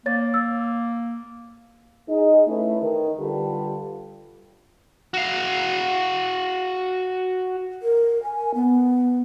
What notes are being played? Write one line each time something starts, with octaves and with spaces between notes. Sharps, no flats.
A#3 C#5 A6
E6
D#4 G#4 D#5
A3 C#4 E4 A4 B4
D#3
D3 G3 F4 G4 A4 B4
F#4 F5
A#4
G#5
B3